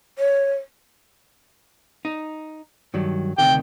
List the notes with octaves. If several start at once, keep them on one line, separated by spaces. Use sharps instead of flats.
C#5
D#4
G2 D#3 F#3
D2 C3 D#3 G5